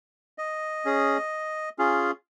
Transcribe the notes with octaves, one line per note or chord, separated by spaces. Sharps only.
D#5
C#4 G#4
C#4 F4 G#4